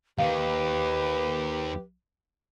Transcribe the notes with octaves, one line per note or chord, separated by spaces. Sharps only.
D#2 D#3 G4 B4 F5